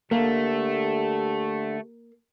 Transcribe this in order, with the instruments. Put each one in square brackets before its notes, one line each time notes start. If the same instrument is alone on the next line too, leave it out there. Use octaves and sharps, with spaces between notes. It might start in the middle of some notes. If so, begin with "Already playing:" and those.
[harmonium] D3 [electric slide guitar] A3 [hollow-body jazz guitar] A#3 [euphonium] G4